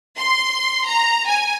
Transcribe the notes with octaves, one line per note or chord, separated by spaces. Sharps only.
C6
A#5
G#5